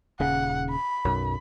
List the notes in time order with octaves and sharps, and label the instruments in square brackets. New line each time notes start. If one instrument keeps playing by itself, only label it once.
[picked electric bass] D#1 C#3 [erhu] F#5
[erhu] B5
[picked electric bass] B1 F#2